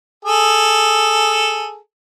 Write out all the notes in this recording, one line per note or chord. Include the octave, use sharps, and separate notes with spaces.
G#4 A4